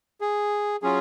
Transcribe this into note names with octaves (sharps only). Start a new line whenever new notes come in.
G#4
F#3 C#4 F4 G#4